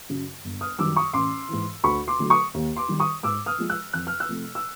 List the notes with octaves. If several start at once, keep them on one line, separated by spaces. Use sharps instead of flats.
F#2 C#3 F#3
G1
D#6 F6
F#2 D#3 G3 D6 E6
C#6 D#6
A1 C6 D6
G#2 E3
D2 B5 C#6
C6 D6
D3 F#3 A3
C#6 D#6
D#2
C6 D6
D#3 G3
C#6 D#6
G#2 D6 E6
D#6 F6
F3 G#3
E6 F#6
F2 F#6
F6
E6 F#6
C3 F3 A3
E6